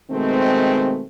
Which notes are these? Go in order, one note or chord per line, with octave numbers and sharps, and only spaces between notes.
B2 D#3 G#3 A3 C4